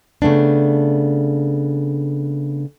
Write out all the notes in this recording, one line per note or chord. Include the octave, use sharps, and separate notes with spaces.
C#3 A3 B3 D4